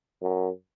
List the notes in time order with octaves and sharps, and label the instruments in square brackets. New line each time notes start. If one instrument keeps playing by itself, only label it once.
[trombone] F#2